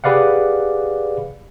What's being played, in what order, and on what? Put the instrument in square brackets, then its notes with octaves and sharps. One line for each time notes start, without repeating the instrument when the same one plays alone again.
[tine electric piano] G4 G#4 B4 D5 F5 F#5